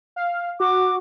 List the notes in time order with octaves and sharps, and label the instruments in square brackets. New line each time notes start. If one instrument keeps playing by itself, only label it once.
[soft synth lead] F5
[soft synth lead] F#4 [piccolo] D6